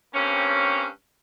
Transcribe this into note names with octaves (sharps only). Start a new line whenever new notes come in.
G2 A#3 C4 C#4